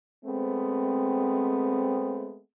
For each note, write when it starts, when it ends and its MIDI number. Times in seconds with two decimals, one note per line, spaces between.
0.25 2.39 56
0.25 2.39 57
0.25 2.39 59
0.25 2.39 60